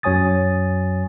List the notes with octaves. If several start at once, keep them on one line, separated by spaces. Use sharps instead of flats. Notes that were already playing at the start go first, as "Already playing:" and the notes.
F#2 F#3 C#5 G#5 D#6 A6